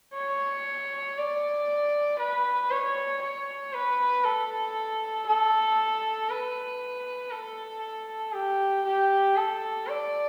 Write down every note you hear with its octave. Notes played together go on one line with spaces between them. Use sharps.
C#5
D5
B4
C#5
C#5
B4
A4
A4
B4
A4
G4
G4
A4
D5